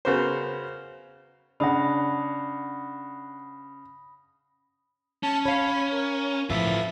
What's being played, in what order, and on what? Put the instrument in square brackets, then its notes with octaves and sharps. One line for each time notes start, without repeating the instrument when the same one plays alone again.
[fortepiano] C#3 B3 F#4 A#4 C5
[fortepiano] C#3 [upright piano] D4 F#5 [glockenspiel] B5 D#6 A#6
[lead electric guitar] C#4 [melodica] A5
[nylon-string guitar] C#5 F5 [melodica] B5
[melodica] A#4
[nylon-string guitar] E2 A2 F3 [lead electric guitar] F4 B4 [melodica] E5